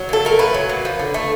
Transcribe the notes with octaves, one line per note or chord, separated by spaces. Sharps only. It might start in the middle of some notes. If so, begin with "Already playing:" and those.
Already playing: F#3
A#2 A4
A3 A#4
A#2 B4
F#3
A#2
F3
D3
A3